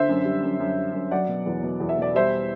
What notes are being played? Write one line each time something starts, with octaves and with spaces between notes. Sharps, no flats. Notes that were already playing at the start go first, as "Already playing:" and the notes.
Already playing: D3 C5 E5
F#2
G3
F#2
F#2
G3
F#2
F#3 D5 F#5
B2
E2
B2
E2
E5
B2 D5
G3 C5 E5